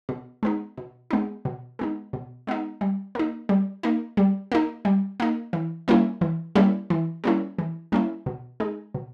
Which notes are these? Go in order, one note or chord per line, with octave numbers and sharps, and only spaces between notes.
B2
G#3 B3 D#4
B2
G#3 B3 D#4
B2
G#3 B3 D#4
B2
G#3 B3 D#4
G3
A#3 D#4
G3
A#3 D#4
G3
A#3 D#4
G3
A#3 D#4
E3
G3 A#3 C#4 E4
E3
G3 A#3 C#4 E4
E3
G3 A#3 C#4 E4
E3
G3 A#3 C#4 E4
B2
G#3 D#4
B2